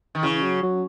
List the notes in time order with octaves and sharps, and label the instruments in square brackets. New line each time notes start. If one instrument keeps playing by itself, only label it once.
[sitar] D#3
[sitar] C#3 [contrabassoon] E3
[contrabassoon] F#3
F#3